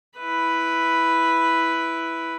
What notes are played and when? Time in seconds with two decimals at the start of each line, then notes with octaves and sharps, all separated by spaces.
0.18 E4 B4